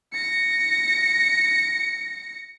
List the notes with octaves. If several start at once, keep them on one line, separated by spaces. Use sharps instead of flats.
A#6 C#7